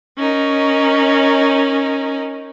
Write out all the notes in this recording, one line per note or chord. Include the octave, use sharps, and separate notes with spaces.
C#4 D#4 A#4